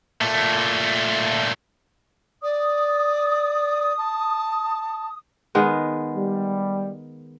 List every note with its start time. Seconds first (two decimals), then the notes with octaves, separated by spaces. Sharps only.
0.21 A#2 A3
2.43 D5 D#6
3.98 A5
5.55 D#3 G#3 B3
6.14 G3